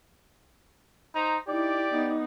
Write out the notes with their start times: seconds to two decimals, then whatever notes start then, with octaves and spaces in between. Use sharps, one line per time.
1.14 D#4 C5 A#5
1.48 D#4 E4 G4 D5
1.88 B3 D#4